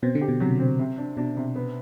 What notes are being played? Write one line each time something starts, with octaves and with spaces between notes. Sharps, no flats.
B2 C4
D3
G4
B2
C3 F#3
C4
C3
D4
B2 D4
C3
B3